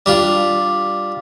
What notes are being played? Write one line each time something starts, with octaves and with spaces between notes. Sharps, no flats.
G3 D4 F4